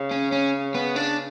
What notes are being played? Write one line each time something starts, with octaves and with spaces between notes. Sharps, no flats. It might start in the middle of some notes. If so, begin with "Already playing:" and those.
Already playing: C#3
C#4
C#4
B3
D4